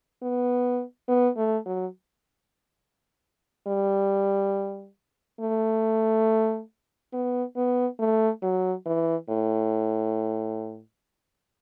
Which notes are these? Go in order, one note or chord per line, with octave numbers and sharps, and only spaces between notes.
B3
B3
A3
F#3
G3
A3
B3
B3
A3
F#3
E3
A2